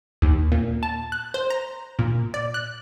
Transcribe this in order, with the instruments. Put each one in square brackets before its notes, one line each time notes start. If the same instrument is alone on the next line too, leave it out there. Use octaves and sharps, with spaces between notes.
[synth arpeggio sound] D#2
A#2
A5
F#6
C5
A#5
A#2
D5
F#6